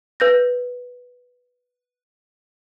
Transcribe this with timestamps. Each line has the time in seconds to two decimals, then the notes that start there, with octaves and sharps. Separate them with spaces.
0.20 B4 G6 A#6